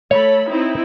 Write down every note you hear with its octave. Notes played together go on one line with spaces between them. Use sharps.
A3 A4 C#5 B5
C4 D#4 E4